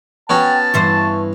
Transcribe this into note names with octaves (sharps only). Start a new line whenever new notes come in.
B3 C#4 F#4 G5 A5
G2 E3 C5 C#6